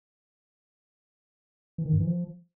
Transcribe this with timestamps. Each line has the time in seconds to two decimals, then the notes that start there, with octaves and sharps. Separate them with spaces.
1.78 E3
1.86 D#3
1.93 G2
2.00 E3
2.07 F3